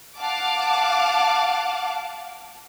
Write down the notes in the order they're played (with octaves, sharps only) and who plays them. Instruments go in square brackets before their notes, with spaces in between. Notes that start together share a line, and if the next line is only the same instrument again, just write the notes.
[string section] F5 F#5 A5 D6